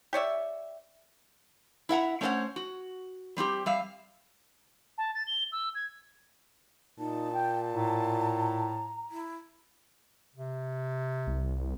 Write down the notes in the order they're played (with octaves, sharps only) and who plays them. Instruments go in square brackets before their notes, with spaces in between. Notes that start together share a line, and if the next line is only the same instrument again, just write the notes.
[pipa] G4 C#5 D5 E5
[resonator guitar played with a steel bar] E4 E5 F#5 A#5
A3 C#4 D4 C5 C#5 F#5
F#4
G3 C4 F4 G4
G3 E5 F5
[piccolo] A5
A6
G7
E6
G#6
[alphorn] A#2 [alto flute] D#4 [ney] A5
[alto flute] G5
[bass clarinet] A2 [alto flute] A#5
[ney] E4
[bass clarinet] C3
[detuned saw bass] C2